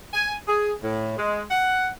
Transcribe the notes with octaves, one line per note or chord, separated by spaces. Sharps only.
G#5
G#4
A2
G#3
F#5